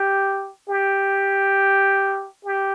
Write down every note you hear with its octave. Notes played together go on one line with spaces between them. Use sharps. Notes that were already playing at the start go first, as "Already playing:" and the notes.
Already playing: G4
G4
G4